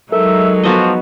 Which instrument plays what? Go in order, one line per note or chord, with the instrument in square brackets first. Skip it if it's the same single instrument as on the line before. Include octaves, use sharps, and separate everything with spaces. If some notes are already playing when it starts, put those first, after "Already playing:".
[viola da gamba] F#3 G#3 D#4 [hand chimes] A4 A#4 [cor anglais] E5
[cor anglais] F3 [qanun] B3 F#4 D#5